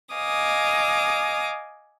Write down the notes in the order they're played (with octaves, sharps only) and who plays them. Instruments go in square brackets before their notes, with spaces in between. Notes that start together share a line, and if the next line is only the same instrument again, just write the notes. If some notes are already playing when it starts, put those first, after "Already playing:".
[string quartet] D#5 F5 G#5 D6 D#6